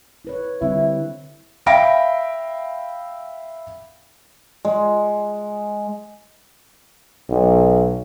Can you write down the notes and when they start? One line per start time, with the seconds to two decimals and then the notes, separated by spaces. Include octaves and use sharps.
0.25 E4 B4 C#5
0.62 D3 G3 C4 E4
1.66 E5 F5 G5 B5 A#6 D7
4.65 G#3
7.29 B1